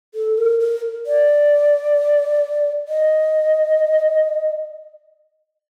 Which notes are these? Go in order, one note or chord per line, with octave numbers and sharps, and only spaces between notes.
A4
A#4
A#4
D5
D#5